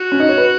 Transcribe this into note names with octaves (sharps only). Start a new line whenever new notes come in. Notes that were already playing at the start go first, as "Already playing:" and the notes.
Already playing: F#4
C#4
D#4
C#5
B4